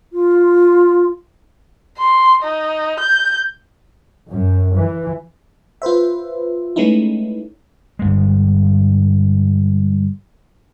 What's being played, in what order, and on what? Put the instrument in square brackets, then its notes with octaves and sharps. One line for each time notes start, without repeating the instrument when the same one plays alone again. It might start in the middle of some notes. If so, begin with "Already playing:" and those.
[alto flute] F4
[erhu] C6
D#4
G6
[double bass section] F#2
E3
[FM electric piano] F4 B4 C5 E5
G#3 A3 B3 C#4 D#4 E4
[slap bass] G1 G2 G#3